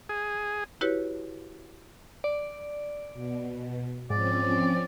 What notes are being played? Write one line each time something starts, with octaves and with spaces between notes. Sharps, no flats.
G#4
E4 F#4 G4 B4 C#5
D5
B2
G#2 F3 C4 C#4 D5